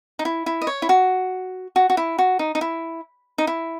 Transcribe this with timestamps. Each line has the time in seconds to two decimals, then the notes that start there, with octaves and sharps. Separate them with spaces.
0.19 D#4
0.25 E4
0.46 E4
0.61 D#5
0.67 C#5
0.82 E4
0.89 F#4
1.76 F#4
1.90 F#4
1.97 E4
2.19 F#4
2.39 D#4
2.55 D#4
2.61 E4
3.38 D#4
3.47 E4